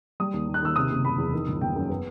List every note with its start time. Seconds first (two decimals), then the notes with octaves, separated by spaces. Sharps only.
0.20 G3 D#6
0.34 D#2
0.48 D#2
0.54 F#6
0.63 D#3 E6
0.76 C3 D#6
0.91 F#1
1.05 F#1 B5
1.18 E2
1.34 D#3
1.48 G1
1.61 G1 G5
1.76 F#2
1.89 B3